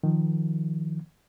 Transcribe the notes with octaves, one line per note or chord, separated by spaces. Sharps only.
D#3 F3